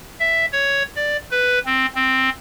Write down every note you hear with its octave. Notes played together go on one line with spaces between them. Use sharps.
E5
C#5
D5
B4
C4
C4